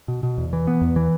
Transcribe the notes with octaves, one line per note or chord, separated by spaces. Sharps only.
B2
B2
E2
E3
B3
E2
E3